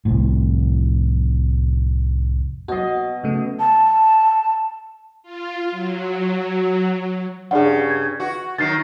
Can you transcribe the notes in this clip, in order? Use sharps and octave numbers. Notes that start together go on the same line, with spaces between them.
C2 F2 A2
B2 F#3 F#4 D#5
C#3 A3
A5
F4
F#3
G2 C#3 G#4 D5 F#5
G#6
F#4
D#3 F#3 A6 C7